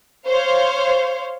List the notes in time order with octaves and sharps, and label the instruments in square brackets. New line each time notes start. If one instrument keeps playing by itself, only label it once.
[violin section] C5 C#5 F5